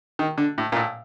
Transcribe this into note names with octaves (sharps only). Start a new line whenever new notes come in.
D#3
D3
A2
A#2
A2